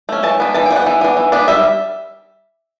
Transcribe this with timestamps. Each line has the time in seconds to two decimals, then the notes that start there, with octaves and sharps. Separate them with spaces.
0.09 A3 C#4
0.23 E3 A5
0.40 B3 D4
0.54 E3 A5
0.66 G5
0.70 B3 D4
0.76 F#5
0.86 E3
1.01 B3 D4
1.17 E3
1.32 B3 D4
1.48 G3 E5